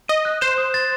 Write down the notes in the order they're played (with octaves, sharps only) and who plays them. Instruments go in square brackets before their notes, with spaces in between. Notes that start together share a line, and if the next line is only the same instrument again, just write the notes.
[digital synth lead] D#5 [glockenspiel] D#7
[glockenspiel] F#6
[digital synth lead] C5 [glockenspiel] E7
[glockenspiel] D#6
A6